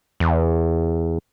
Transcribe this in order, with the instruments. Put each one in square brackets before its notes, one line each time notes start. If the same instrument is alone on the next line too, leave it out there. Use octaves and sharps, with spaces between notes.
[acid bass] E2